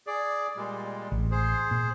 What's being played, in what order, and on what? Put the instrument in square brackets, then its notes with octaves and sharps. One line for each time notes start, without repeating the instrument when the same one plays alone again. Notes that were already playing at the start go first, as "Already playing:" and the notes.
[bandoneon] G#4 D5
A#2 G3 G#3
[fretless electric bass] A1
[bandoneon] G#4 C5
[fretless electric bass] A#2